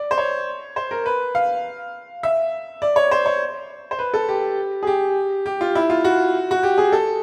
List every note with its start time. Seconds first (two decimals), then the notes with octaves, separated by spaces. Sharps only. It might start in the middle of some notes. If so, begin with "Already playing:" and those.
Already playing: D5
0.11 C5
0.18 C#5
0.76 C5
0.91 A#4
1.06 B4
1.35 F5
2.23 E5
2.82 D5
2.96 C#5
3.11 C5
3.26 C#5
3.91 C5
3.99 B4
4.14 A4
4.29 G4
4.83 G#4
4.87 G4
5.46 G4
5.61 F4
5.75 E4
5.90 F4
6.05 F#4
6.51 F#4
6.63 G4
6.78 G#4
6.92 A4